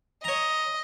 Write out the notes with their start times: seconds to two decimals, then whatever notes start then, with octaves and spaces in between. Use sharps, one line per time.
0.24 C#5 D#5 A#5